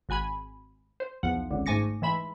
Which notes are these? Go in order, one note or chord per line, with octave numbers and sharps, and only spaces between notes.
G#1 F#4 G#5 B5 G#6
C5
B1 E2 F3 F#5
G#1 C#2 D3
G#2 A3 G#5 D6 A#6 C#7
E3 G#3 E5 B5